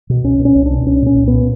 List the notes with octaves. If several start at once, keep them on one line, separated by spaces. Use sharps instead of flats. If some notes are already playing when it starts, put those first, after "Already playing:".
B2
C2 C#4
B2
C#4
C2
D4
B2
C2 C#4
A#2 C#4
C2
B3
A#2